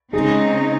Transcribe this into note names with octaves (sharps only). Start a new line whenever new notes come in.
C#3 G#3 C4 D#4 G#4